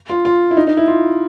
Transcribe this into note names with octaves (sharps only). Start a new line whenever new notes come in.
F4
F4
E4
D#4
D#4
E4
F4